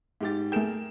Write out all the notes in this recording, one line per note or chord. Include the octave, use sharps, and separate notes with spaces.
G#2 G4 A6
A3 G#4 A#4 G5 E7